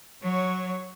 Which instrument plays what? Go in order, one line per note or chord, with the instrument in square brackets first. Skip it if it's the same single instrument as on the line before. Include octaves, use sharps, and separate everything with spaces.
[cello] F#3 C#5